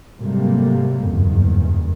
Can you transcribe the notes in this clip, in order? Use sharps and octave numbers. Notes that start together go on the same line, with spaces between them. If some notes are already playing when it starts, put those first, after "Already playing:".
G#2 C3 F#3 G3 A3 A#3
F#1 E2 G2 D#3